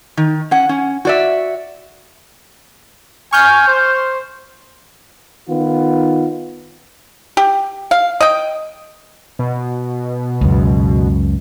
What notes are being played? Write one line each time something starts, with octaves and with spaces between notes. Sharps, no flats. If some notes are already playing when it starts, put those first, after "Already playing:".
D#3
C#4 F#5
C#4
F#4 D5 E5
G#5 C#6 F6 G6
C5
D#3 B3 F4
G4
F5
D#5 G5
B2
C#2 F#2